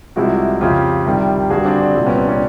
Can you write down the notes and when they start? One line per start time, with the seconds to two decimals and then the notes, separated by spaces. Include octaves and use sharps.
0.16 C2 C3 F3 G#3 E4 F#4
0.61 F2 C#3 F3 F4 G4
1.06 C2 C3 D#3 G3
1.50 G2 D3 G3 F#4 G#4
1.65 C4 D4
1.80 C4
1.95 C2 A#2 G3 C4
2.06 B3 C#4
2.17 C4 D4
2.29 B3 C#4